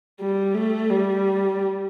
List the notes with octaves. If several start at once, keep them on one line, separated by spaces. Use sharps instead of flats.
G3
A3
G3